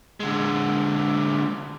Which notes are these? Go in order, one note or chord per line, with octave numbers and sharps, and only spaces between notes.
D3 G#3